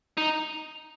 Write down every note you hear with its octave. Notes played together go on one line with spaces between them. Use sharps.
D#4